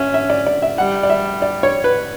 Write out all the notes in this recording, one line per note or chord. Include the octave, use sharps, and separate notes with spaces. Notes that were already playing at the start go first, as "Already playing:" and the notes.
Already playing: C#4 E5
E5
D5
D5
E5
G3 F#5
D5
E5
D5
C#5
B4